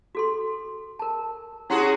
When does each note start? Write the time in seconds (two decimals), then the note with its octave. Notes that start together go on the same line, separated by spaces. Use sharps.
0.15 F#4 A4 C6
0.99 A#4 A5
1.70 C#4 E4 F#4 G#4 F#5 C6